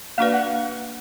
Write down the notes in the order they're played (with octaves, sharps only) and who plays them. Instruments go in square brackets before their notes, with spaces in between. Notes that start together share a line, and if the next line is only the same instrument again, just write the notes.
[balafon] A#3 D4 F#4 B4 D5 [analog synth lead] F5
[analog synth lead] F#5